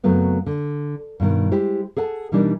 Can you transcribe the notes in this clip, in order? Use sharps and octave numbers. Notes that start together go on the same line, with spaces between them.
F#2 C#3 F#3 A3 B3 C4
D3
G2 B2 D#3
G#3 E4 G4 C5
G#4 A4 F#5 A5
B2 E3 G3 D4 D#4 A#4